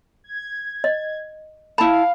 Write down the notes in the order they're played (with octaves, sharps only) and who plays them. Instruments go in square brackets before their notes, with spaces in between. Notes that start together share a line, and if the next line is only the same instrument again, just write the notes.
[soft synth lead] G#6
[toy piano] D#5
[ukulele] E4 A5 [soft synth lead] F5 [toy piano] B5